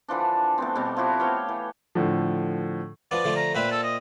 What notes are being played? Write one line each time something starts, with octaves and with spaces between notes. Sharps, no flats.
D3 E3 F3 D4
A3 B3 C4
B2 G3 A3 C4
F3 E4 F#4 G4
B3 C#5 F5 G5
E3
A2 D3 F3
F3 B3 D5
D3 F3 A3
A#5
A#2 C4 B4 E5
A4
D#5